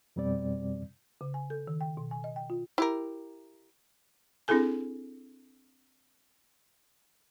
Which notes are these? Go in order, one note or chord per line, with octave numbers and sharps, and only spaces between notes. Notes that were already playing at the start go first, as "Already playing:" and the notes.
F2 B2 G3 C4 D5
C#3
G#5
A4
D#3
G5
B2
G#5
D#5
G5
F4
E4 G4 A#4
C4 D4 E4 G#4 A4 G#5